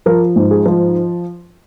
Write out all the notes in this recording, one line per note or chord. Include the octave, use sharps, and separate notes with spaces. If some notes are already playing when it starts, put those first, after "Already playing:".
F3 A#4
G#2
G#4
F3